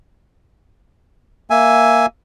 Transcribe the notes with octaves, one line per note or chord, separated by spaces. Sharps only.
A#3 E5 G#5